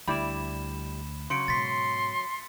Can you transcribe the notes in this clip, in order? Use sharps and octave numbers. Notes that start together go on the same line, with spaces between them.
D2 G3 E4 D5 B5 E7
C#3 F#3 C6 C#7 D7
G#2 B2 C6 A6 B6